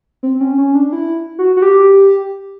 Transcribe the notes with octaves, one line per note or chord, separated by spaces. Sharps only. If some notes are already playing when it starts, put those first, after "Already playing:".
C4
C#4
C#4
D4
E4
F#4
F#4
G4